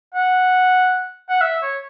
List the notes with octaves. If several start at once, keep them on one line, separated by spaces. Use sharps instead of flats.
F#5
F#5
E5
C#5